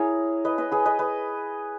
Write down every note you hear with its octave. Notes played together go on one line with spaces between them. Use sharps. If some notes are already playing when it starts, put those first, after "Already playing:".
Already playing: E4 G#4 A#4 C#5
B4 D#5
B4 D#5
G#4 B4
B4 D#5
B4 D#5